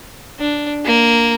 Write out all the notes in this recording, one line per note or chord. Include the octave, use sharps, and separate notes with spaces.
D4
A#3